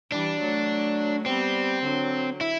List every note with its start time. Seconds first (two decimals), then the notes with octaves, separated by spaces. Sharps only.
0.11 E3 G3 D4
0.40 F#3 A3
1.26 G3 B3 C4
1.84 D3 F#3
2.41 E4